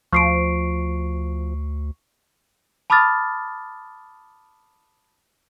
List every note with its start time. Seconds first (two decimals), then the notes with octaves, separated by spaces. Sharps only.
0.13 D2 F3 C#6 C7 D7
2.90 A5 B5 D6 D#6 F6 A6